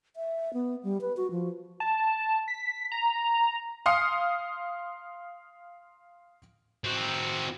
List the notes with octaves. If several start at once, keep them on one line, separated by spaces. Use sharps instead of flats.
E5
B3
G3
B4
F#4
F3
A5
B6
A#5
F5 C6 D#6 F6 C7 C#7
C4 F#4